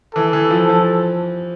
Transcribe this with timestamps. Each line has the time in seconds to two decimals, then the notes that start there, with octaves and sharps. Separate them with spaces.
0.15 E3 A4
0.33 E3
0.51 F3
0.69 F3